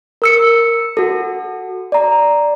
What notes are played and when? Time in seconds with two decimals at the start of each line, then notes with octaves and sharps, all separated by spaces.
0.22 A#4 E6 C#7
0.97 F#4 A4
1.92 D5 A#5